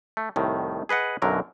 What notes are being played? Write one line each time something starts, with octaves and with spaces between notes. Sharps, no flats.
A3
C2 A2 D#3
G#4 B4 D#5 F#5
B1 F#2 D3 F#3 A#4